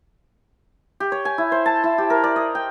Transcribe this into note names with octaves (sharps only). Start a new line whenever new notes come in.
G4
C#5
G#5
E4
C5
A5
E4
G4
A#4
D5
D#5
G5